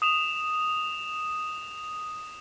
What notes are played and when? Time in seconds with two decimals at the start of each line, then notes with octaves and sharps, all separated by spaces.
0.02 D#6 E7 F7